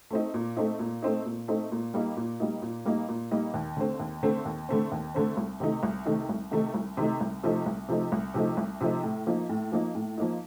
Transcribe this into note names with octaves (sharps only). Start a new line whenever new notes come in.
A3 C4 D#4
A#2
A3 C4 D#4
A#2
A3 C4 D#4
A#2
A3 C4 D#4
A#2
G3 A#3 D#4
A#2
G3 A#3 D#4
A#2
G3 A#3 D#4
A#2
G3 A#3 D#4
D#2
D3 A3 C4
D#2
D3 A3 C4
D#2
D3 A3 C4
D#2
D3 A3 C4
C2
C3 D#3 A3 D#4
C2
C3 D#3 A3 D#4
C2
C3 D#3 A3 D#4
C2
C3 D#3 A3 D#4
C2
C3 F3 A3 D#4
C2
C3 F3 A3 D#4
C2
C3 F3 A3 D#4
C2
C3 F3 A3 D#4
A2
F3 A#3 D#4
A2
F3 A#3 D#4
A2
F3 A#3 D#4